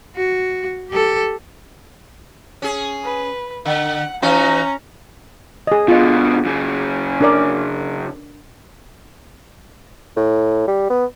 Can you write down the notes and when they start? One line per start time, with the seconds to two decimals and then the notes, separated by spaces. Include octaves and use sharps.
0.16 F#4
0.90 G4 A4
2.62 C#4 G#4
3.04 B4
3.66 D3 F#5
4.22 E3 C#4 D#4 F#4 A#5
5.67 G#4 D#5
5.88 B2 D3 F4 D#5
6.45 F#2 C#3
7.21 D4 A#4 D5
10.17 A2
10.68 G3
10.90 B3